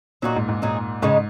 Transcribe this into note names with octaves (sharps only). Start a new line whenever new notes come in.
A#2 F#3 D#4 F#4
G#2
G#2
A#2 F#3 D#4 G#4
G#2 C#3 G#3 D#4